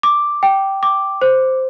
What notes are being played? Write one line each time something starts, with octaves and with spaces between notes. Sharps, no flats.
D6
G5
D6
C5